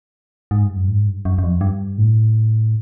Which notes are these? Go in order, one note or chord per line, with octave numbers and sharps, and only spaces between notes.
G#2
G2
F#2
G#2
G2
F#2
F#2
F2
G2
A2